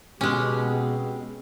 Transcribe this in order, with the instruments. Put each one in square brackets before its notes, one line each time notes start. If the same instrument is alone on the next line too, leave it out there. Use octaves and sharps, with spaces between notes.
[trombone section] B2 [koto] G#3 C#4 [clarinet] G4
[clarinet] C4